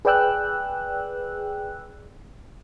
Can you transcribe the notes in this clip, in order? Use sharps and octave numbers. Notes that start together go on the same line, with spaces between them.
G#4 B4 D5 G5 E6 F#6